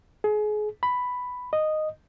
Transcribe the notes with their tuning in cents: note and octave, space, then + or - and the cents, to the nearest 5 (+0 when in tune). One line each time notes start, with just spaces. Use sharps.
G#4 +30
B5 +5
D#5 -10